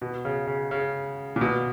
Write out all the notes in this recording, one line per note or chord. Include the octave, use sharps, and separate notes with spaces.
B2
C#3
C#3
C#3
A#2
B2